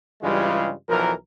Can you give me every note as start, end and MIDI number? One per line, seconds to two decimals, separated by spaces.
0.22 0.71 43
0.22 0.71 49
0.22 0.71 52
0.22 0.71 55
0.22 0.71 56
0.22 0.71 65
0.89 1.13 35
0.89 1.13 52
0.89 1.13 53
0.89 1.13 70